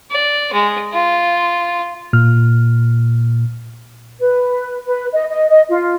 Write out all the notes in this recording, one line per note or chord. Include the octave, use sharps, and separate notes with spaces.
D5
G#3
F4
A#2 F6
B4
B4
D#5
D#5
D#5
F4